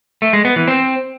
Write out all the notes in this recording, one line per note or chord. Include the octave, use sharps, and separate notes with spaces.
A3
G#3
B3
E3
C4